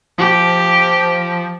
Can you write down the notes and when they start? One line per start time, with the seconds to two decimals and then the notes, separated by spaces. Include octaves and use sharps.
0.18 F3 G4